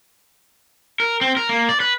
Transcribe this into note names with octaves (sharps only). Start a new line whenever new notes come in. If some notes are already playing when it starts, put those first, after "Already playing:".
A#4
C4
A#4
A#3
D5
B4